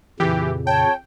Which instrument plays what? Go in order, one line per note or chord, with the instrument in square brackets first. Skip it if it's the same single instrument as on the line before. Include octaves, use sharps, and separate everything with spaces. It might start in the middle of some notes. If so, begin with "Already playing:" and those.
[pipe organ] F2 A#2 C#3 [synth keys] E3 G4
[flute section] C#5 A5 [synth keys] G5